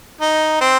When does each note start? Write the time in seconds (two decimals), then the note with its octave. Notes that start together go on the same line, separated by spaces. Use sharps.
0.21 D#4
0.61 C4